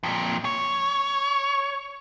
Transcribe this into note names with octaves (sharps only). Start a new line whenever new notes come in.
F2 A#2
C#5